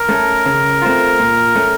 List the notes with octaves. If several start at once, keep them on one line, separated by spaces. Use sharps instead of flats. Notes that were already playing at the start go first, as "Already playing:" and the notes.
Already playing: A#4
A3 C#4 A4
C#3
A3 C4 F4
A#2
A3 C#4